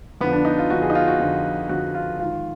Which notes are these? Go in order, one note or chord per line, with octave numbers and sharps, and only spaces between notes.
F2 D3 F3 B3
D4
D#4
F4
F2 D3 F3 F#4
G#4
D#4
F4
F#4
F2 D3 F3
F2 D3 F3 F#4
F4
G#2 D#3 F4